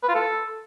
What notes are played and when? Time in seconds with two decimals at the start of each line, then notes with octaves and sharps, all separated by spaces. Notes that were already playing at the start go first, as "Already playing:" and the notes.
0.03 B4
0.09 F4
0.15 A4